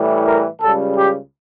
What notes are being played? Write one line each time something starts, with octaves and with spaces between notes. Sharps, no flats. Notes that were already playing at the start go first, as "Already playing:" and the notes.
Already playing: A2 E3 G3
A#4
C#2 C#3 G3 A4
G4